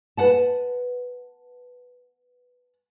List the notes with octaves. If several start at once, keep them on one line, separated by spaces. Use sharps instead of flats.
B4 F#5 A5